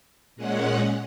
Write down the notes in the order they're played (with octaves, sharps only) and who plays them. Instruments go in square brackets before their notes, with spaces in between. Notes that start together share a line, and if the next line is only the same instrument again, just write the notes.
[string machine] A#2 G#3 C#4 F#5